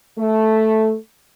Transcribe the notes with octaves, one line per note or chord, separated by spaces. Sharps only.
A3